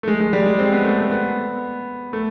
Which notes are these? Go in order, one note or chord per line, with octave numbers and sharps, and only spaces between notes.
A3
G#3
G#3
G3
G#3
C4
B3
A3
A3
B3
A3